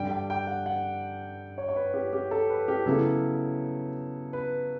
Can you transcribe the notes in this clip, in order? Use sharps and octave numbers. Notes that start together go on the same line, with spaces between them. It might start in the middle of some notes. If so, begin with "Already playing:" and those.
Already playing: G2 D3 G3 D4 G5
G5
G5
F#5
F#5
C#5
C#5
B4
G4
G4
A4
B4
G4
C#3 F#3 B3 E4 A4
B4